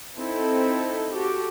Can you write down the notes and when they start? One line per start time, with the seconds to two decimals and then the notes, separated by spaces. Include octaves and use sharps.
0.18 C4 D#4 E4 A4
1.15 F#4 G4 A4